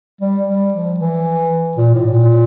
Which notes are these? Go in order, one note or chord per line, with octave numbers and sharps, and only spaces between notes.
G3
G3
F3
E3
A#2
A2
A#2